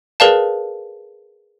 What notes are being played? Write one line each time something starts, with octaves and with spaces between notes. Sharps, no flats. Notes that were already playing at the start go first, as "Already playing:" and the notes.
G#4 A#4 B4 D5 F5 A5